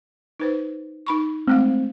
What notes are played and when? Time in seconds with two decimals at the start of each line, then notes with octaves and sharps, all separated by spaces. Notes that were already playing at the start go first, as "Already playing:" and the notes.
0.40 D#4 B4 C5
1.07 D#4 B5 C#6
1.47 G#3 A3 C4 F5